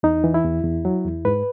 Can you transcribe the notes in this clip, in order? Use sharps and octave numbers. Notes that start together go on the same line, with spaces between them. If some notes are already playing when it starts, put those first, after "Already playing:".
E2 D#4
E3
E4
E2
E2
F#3
E2
G#2 B4